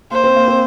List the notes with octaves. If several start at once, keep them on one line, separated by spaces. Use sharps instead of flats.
A#3 C5
C4
A#3
C4